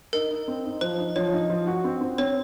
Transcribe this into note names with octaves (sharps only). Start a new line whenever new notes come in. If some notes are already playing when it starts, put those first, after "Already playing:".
D#4 A#4
D#4
C4
D#4
F3 C5
D#4
F3 C#5
D#4
F3
F#4
C4
C4
C4 C#5